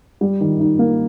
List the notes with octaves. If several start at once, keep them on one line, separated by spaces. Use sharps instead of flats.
G3
D#3
D#4
A#3